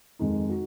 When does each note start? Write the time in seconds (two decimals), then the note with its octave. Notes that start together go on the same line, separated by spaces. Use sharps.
0.19 F2 D#3 G#3 D#4
0.49 D#4 F#4